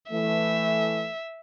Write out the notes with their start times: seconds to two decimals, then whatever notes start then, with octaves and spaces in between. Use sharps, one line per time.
0.12 E3 A3 E5